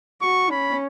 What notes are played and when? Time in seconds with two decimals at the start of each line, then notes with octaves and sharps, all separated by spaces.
0.22 F#4 C#6
0.50 C#4 B5